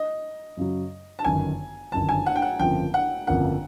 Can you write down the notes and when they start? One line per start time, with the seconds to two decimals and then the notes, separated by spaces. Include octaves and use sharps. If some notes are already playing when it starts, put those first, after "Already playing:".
Already playing: D#5
0.57 F#2 C#3 F#3
1.19 A5
1.25 G1 F#2 D#3 G#5
1.92 G1 F#2 D#3 A5
2.09 G#5
2.26 F#5
2.36 G5
2.42 F#5
2.59 G1 F2 C#3 F3 A#3 G5
2.94 F#5
3.27 G1 F2 C#3 F3 A#3 F#5